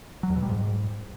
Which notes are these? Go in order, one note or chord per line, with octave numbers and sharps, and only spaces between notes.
F#3
E2
B2
G3
G#2